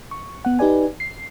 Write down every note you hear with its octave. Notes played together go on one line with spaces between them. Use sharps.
C#6
B3 F#5
D#4 G4 B4 D5 G#5
C7